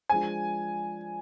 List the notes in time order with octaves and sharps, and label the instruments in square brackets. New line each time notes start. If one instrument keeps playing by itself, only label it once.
[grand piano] F3 G#3 D4 G#4 C5 [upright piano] G#5